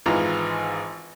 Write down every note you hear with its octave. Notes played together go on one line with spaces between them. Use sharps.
G#1 G#2 E3 F4 A#5